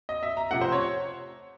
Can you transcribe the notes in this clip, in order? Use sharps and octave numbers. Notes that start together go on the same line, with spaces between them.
D#5
E5
A#5
C3 F3 A3 F#5
C5
C#5